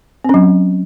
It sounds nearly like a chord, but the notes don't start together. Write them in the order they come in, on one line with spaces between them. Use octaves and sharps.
C4 C#4 F#3